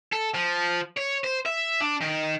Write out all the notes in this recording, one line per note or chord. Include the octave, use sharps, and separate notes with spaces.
A4
F3
C#5
C5
E5
D4
D#3